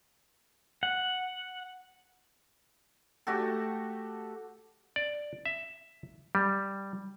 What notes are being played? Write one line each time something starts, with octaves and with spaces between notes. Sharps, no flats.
F#5
A3 F#4 G4 A4
D5
E5
G3